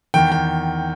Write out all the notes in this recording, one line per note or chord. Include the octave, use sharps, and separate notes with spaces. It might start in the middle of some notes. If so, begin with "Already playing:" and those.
E2 D#3 G5
G5